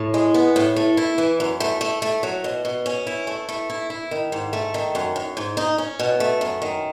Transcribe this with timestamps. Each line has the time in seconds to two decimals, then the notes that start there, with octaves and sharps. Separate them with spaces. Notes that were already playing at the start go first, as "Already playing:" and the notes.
Already playing: A2
0.14 G#3
0.34 B3
0.56 A2
0.76 A3
0.97 E4
1.18 E3
1.40 F#2
1.60 A3
1.81 A3
2.02 A3
2.23 F#3
2.44 B2
2.65 B2
2.86 C#4
3.07 E4
3.27 A3
3.49 A3
3.70 E4
3.90 E4
4.11 D#3
4.32 G#2
4.53 A3
4.74 D#3
4.95 F#2
5.16 F#2
5.37 G#2
5.57 D#4
5.78 C#4
5.99 B2
6.20 A3
6.41 F#2
6.62 D#3